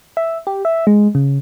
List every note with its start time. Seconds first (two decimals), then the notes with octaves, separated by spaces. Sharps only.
0.17 E5
0.47 G4
0.65 E5
0.87 G#3
1.15 C#3